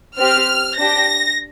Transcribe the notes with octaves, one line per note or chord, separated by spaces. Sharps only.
C4 G4 F6
D4 G4 A#6